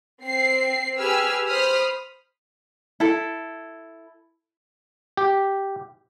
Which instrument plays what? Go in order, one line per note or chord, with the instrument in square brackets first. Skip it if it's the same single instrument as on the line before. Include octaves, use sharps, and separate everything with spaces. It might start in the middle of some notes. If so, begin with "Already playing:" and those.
[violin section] C4 C7
G4 G#4 B4 G#5 E6 F6
C5 B5 D#6 F6
[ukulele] E4 A4
[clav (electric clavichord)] G4